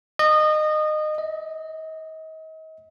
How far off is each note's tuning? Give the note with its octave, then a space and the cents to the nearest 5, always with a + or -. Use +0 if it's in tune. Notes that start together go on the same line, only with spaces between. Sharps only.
D#5 -25
D#5 +35